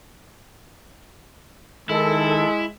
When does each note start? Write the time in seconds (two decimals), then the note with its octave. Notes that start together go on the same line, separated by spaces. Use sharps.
1.89 D#3 G#3 E4 A4